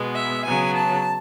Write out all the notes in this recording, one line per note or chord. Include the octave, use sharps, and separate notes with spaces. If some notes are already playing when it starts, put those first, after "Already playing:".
Already playing: B2 G#3 B3
E5
C#3 F#3 B3 G#5
A5